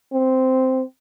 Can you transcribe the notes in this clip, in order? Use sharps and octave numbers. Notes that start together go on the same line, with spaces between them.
C4